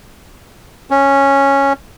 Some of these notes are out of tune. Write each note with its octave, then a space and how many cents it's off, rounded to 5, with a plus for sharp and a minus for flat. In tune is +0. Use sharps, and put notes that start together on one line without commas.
C#4 -5